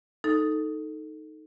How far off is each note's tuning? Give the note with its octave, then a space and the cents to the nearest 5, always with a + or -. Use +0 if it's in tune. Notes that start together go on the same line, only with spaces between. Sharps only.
D#4 +0 A4 +0